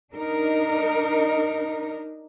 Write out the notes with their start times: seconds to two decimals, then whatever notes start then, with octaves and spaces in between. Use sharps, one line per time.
0.13 D4 D#4 A#4